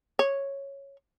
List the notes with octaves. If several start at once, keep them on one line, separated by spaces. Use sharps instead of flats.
C#5